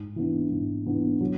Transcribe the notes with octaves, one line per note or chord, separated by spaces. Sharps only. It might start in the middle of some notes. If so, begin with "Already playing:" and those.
Already playing: G#2
E3 B3 D4
G#2
E3 B3 D4
F#3